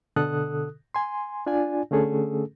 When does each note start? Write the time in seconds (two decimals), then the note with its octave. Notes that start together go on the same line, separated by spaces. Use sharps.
0.16 B2 D3 A4 D#6 F#6
0.95 G#5 C6
1.47 D4 F4 D5 G#5
1.91 D3 A3 C#4 G#4 A4